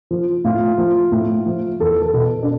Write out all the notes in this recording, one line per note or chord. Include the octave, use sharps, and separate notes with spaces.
F3
A2 F4
F3
A2
F3
E2 A4
A4
B2
D4